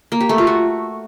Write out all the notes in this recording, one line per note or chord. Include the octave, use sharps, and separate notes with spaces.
A#3
G4
A3
F4
F#4